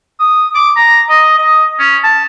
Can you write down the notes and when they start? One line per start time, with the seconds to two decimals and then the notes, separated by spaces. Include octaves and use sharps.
0.20 D#6
0.55 D6
0.76 A#5
1.09 D#5
1.39 D#5
1.80 C#4
2.04 A5